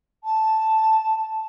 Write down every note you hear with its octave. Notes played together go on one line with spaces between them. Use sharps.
A5